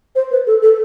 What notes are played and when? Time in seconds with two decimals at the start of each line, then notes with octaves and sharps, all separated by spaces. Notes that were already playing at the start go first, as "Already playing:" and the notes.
0.15 C5
0.31 B4
0.47 A4
0.62 A4